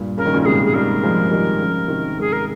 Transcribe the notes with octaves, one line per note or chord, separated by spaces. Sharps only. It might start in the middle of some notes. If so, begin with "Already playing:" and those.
Already playing: G2 A#2
C#3 A#4
D#3
A#2 C#3
A#4
G#2 C3 G#4
G#4
D#3 G3 A#4
F3 G#3
F3
D#3 G3
C#3 F3
C3 D#3
G#2 G#4
A#4